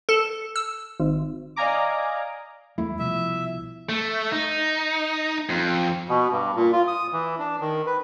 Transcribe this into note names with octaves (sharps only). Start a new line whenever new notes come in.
A4
E6
G#1
D5 D#5 F5 G#5 A#5 D6
E2 G3 A3 E4
C2 B2 F3 E5
A3
D#4
F2
B2
G2
A#2
F4
D#6
E3
D4
D#3
B4